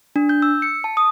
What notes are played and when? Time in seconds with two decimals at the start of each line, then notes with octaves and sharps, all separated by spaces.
0.16 D4
0.29 G6
0.42 E6
0.62 C#7
0.84 A5
0.97 D#6